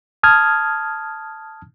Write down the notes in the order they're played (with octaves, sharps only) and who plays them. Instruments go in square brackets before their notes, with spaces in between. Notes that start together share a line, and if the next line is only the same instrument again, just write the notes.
[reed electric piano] A5 D#6 F6 G#6